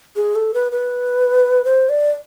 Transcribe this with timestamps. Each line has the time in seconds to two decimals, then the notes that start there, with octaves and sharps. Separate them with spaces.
0.16 G#4
0.35 A4
0.54 B4
0.72 B4
1.65 C5
1.89 D5